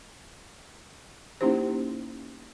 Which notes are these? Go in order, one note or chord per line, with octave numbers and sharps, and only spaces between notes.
A#3 C#4 D#4 E4 G4 C5